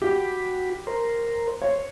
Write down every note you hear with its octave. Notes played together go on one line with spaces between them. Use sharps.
F#4 G4 B5
A#4 C5
C5 C#5